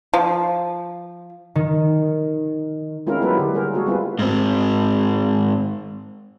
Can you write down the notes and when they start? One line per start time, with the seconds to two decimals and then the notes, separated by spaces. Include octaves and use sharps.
0.14 F3
1.55 D#3
3.07 G#3 C4 C#4 E4 F4 A#4
3.22 F#3 A#3 B3 E4 A4 B4
3.37 D3 G4
3.54 G3 G#4 A#4 C5
3.74 G#3 A#3 F#4 G#4 A4
3.86 G3 B3 C4 E4 F4 B4
4.19 G#2 C4